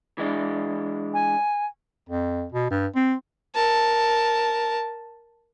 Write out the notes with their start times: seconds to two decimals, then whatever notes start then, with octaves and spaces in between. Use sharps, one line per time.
0.18 E3 G#3 D4
1.14 G#5
2.09 F2
2.52 B2
2.70 G2
2.96 C4
3.54 A#4 A5